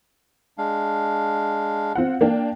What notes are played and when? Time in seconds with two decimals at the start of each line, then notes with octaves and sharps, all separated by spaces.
0.58 G#3 D4 F5
1.95 C4 F4 F#5
2.21 A#3 D4 G5